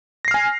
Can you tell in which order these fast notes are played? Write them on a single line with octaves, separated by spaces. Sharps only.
A#6 C7 F6 G#5